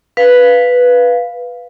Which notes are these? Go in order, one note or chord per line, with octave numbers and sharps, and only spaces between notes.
B4 F5